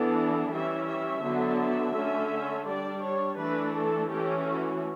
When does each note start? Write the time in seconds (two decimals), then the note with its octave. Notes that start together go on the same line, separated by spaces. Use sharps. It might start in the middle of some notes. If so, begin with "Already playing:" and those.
Already playing: E3 B3 D4 A4
0.51 E3 G3 C#4 E5
0.88 E5
1.23 D3 F#3 B3 D4
1.59 E5
1.95 D3 A3 C#4
2.66 G3 D4 D5
3.03 C#5
3.38 E3 A3 D4 B4
3.74 A4
4.11 E3 A3 C#4 G4
4.46 F#4